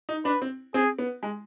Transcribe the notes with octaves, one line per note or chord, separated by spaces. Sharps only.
D#4
D4 B4
C4
C4 G#4
B3
G#3